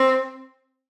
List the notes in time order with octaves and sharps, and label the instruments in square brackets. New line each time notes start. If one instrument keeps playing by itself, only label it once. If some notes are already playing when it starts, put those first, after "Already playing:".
Already playing: [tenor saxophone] C4